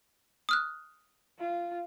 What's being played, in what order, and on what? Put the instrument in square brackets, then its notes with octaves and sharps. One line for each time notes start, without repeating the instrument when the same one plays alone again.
[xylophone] D#6 F6 F#6
[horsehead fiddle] F4